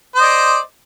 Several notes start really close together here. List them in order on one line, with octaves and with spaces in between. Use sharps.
C5 D#5 D5